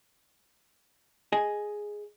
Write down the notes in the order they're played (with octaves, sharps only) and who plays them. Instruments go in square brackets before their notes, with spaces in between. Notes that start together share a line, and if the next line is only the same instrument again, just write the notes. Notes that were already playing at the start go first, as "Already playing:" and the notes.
[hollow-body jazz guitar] G#4 D#5 G#5